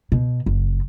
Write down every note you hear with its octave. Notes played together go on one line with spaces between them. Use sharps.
B2
F#1